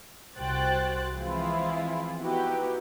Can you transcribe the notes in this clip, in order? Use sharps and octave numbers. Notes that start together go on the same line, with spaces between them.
C2 F#4 C5 G5 F#6 A6
E3 F3 G#3 C4 E4 F4
B3 D#4 E4 F#4 G4 B4